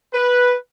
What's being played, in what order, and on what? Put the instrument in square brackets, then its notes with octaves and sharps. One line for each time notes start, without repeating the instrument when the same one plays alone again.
[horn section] B4